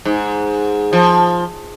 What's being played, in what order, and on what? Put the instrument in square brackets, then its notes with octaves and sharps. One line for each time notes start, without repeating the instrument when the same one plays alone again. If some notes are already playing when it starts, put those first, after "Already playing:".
[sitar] G#2
F3